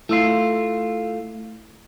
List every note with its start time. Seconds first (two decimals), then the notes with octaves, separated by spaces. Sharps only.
0.09 A3 E4 F4 E6 C7